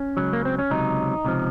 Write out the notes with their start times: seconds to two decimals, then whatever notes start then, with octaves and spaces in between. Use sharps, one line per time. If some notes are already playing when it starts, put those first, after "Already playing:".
Already playing: C#4
0.17 C#2 C#3 F#3
0.33 A#3
0.45 C4
0.59 C#4
0.70 C#2 C3 F#3 D#4
1.25 C#2 C3 F3